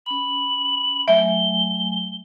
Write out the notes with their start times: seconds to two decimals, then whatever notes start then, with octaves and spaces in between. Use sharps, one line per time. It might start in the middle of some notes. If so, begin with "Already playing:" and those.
0.06 C#4 B5 F#7
1.08 F#3 A3 E5 G#5 G7